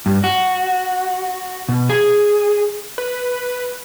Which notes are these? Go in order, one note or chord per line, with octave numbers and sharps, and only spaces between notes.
G2
F#4
B2
G#4
B4